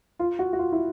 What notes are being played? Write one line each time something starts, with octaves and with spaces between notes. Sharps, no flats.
F4
F#4
F#4
F4
E4